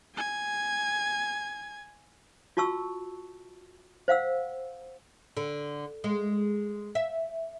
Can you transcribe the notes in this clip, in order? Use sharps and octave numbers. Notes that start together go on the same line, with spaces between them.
G#5 G#6
F4 F#4 A5 C#6 E6
C5 F5 F#5 E6
D3
G#3
E5